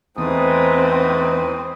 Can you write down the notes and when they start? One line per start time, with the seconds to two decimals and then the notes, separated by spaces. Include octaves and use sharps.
0.18 E2 G#2 A3 C4 B4 D#6